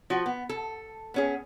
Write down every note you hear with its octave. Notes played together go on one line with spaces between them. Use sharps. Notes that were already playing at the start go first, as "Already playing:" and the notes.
F3 F#4
B3
A4
B3 C#4 G#4